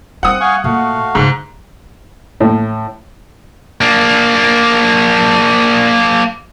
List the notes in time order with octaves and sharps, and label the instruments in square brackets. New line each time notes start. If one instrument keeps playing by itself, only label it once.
[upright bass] G3 [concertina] C4 [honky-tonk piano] F#5 D#6
[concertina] F5 G#5 C#6
[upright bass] A#2 [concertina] A3 F#4 F5
[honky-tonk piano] G#2 [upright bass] C#3 G#3
[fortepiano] A2
[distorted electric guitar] A#3 D4